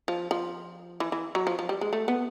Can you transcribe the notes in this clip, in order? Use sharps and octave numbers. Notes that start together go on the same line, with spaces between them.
F3
F3
E3
E3
F#3
F3
F3
G3
G#3
A3
B3